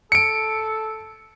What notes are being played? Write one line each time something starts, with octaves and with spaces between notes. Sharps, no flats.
A4 C#7 D7